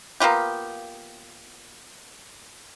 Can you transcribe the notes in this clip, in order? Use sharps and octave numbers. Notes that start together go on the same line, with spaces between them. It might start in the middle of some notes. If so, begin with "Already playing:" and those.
A#3 B3 F4 G4